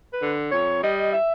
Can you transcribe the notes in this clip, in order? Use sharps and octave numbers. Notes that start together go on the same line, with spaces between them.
B4
D3
F2 C#5
G3 D#5
E5